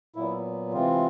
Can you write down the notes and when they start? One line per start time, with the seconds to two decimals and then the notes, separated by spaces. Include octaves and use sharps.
0.16 A#2 F#3 B3 E4
0.73 C3 E3 G#3 C4 F4